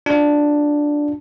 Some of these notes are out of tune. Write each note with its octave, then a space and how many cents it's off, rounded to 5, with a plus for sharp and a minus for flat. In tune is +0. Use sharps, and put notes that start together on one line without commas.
D4 +0 F4 +30